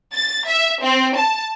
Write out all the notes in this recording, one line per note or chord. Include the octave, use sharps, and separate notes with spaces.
A6
E5
C4
A5